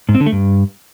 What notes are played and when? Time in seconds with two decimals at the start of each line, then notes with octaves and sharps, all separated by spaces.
0.09 G#2
0.15 C4
0.20 D3
0.26 A3
0.32 G2